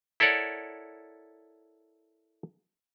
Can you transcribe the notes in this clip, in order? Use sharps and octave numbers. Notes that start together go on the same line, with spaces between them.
E4 A4 A#4 C#5 D5 F#5